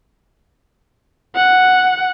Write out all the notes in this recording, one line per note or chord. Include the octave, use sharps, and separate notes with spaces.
F#5